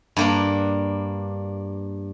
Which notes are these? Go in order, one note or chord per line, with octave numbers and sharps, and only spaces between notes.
G2 A#3 D4